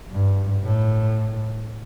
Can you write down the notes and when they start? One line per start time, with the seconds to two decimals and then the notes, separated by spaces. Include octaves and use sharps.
0.11 G2
0.64 A2